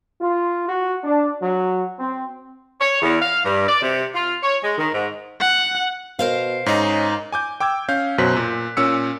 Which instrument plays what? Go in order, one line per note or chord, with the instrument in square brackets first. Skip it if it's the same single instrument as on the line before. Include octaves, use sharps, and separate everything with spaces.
[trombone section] F4
F#4
D4
F#3
C4
[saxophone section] C#5
E2
F5
G2
D5
C3
F4
C#5
G#3
D#3
G#2
[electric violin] F#5
[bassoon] B2 [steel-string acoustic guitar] A#4 C5 F5
[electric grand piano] G#2 D#4 [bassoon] C#4
[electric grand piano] G#5 D6 G6
G5 D6 E6 G#6
C#4 F5 G6
F#2 B2 F#3 C5 F#6 B6
A#2
A#2 C#4 E6 C#7